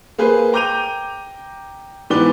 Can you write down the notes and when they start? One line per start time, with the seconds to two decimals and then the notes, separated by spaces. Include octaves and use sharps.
0.18 A#3 G#4 B4 C5
0.53 G5 A#5 D6 G6 D#7 F7
2.10 G#2 E3 B3 D5 D6 G7